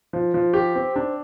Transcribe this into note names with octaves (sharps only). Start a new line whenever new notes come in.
F3
F3
G4
C4
D4